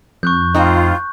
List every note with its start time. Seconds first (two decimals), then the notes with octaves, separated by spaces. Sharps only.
0.23 F2 C#6 F#6 G6
0.55 A2 C4 D#4 F4